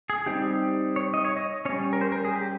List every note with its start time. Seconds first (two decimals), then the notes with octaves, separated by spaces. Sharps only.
0.10 G#4
0.26 G3 C4 D#4 G4
0.96 C#5
1.14 D#5
1.25 C#5
1.37 D#5
1.65 G3 C#4 C#5
1.93 A#4
2.01 C5
2.12 A#4
2.25 G#4
2.36 G4